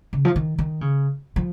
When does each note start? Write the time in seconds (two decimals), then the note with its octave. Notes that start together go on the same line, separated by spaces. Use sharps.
0.13 C#3
0.25 F3
0.36 D#3
0.58 D#3
0.81 C#3
1.36 F3